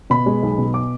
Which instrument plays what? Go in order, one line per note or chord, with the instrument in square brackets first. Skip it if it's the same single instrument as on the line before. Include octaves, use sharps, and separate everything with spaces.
[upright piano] B2 B5
G#3
B1
B2
D6